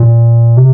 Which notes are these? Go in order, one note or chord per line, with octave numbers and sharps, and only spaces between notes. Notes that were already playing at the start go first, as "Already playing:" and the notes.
Already playing: A#2
C3